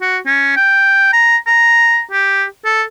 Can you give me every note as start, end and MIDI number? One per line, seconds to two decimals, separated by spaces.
0.01 0.18 66
0.26 0.55 61
0.56 1.09 79
1.13 1.37 82
1.47 2.02 82
2.11 2.45 67
2.65 2.83 69